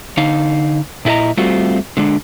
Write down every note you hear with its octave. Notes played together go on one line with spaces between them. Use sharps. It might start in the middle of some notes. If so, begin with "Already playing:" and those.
D3 D#4 F5
A#2 E4 A4 D#5 A#5
G3 A3 C4 F4 F#4
D3 G#3 D4